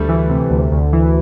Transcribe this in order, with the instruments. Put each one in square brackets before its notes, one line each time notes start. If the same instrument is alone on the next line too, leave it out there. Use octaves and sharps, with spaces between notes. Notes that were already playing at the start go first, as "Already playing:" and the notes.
Already playing: [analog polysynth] D2 [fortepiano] G3 A3
[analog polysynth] E3
C3
D2
D2
E3